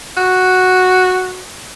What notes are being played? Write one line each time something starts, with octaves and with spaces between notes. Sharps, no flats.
F#4